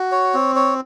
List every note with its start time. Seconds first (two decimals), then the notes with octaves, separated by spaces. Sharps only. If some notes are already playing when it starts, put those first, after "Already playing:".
Already playing: F#4
0.12 C#5
0.34 C4
0.56 C#5